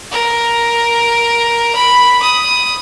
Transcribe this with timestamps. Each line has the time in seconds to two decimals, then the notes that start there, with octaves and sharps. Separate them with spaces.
0.11 A#4
1.75 B5
2.22 D#6